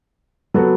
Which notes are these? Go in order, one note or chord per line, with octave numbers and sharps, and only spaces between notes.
F#3 B3 F#4 A4